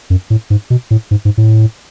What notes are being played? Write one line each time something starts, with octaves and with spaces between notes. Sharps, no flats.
F#2
A2
G#2
B2
A2
G#2
G#2
A2